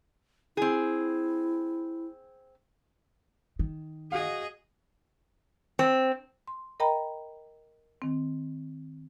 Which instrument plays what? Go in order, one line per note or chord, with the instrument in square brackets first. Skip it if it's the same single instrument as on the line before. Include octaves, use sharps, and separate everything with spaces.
[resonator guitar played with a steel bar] C4 G#4 [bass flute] E4
[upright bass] D#3
[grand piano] F#4 F5 [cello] G#4 D#5
[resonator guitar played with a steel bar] C4
[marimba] C6
A#4 D#5 G5 A#5 B5
D#3 C4